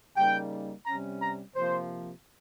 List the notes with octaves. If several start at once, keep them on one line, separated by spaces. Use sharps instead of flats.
C#3 G3 A#3 D#4 G5
C3 G3 C#4 A#5
A#5
C3 F3 A#3 C5